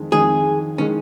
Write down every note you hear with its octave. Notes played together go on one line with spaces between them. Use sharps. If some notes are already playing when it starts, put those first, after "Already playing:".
Already playing: F2 D#3 G#3
F2 D#3 G#3 G#4
D#3 G#3 C#4